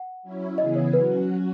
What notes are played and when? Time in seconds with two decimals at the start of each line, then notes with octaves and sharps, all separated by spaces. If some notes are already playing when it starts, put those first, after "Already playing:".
Already playing: F#5
0.23 F#3 C#4 E4
0.58 C#3 E3 B3 E4 G#4 D#5
0.76 C#5
0.93 F#3 C#4 F#4 B4